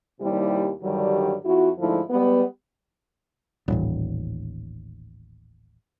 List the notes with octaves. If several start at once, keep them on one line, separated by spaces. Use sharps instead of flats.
D#2 C3 G3 E4 G4
G2 D3 D#3 F#3 G3
F2 E4 F#4
G#2 D3 F3 A3 E4
G3 G#3 B3
D#1 A1